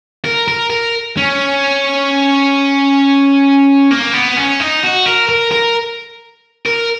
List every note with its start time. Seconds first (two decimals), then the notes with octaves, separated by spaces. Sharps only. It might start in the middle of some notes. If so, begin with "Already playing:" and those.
0.24 A#4
0.48 A#4
0.70 A#4
1.17 C#4
3.91 A#3
4.14 B3
4.37 C#4
4.60 D#4
4.83 F#4
5.06 A#4
5.29 A#4
5.51 A#4
6.66 A#4